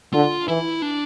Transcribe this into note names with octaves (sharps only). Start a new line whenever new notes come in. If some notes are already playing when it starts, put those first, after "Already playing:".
D3 F4
E3 E4
D4